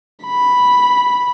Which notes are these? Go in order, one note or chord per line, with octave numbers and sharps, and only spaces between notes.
B5